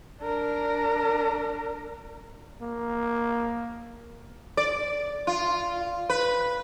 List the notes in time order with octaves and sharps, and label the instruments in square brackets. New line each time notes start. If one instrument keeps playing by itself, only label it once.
[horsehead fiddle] D4 A#4
[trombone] A#3
[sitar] D5
F4
B4